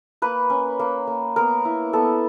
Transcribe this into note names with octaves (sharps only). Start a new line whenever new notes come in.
A#3 B4
C#4
A#3
A#3
B3 A#4
E4
B3 A4